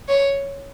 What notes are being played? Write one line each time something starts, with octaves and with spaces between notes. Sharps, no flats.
C#5